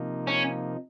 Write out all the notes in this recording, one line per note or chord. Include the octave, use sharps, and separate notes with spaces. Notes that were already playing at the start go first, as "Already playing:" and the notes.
Already playing: C3 F3 A#3 D#4
C#4